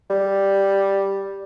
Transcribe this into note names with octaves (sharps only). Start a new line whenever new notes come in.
G3